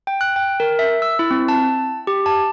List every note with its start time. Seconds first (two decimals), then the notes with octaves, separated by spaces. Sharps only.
0.07 G5
0.21 F#6
0.36 G5
0.60 A#4
0.79 E5
1.02 E6
1.19 E4
1.31 C4
1.48 A5
2.07 G4
2.26 A5